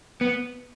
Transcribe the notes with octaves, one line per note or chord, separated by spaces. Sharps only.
B3